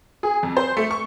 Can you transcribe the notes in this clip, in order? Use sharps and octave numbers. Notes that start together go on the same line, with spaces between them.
G#4
F2
C5
A3
C#6